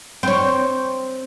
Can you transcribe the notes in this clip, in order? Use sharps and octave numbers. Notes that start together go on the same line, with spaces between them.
C4 C#5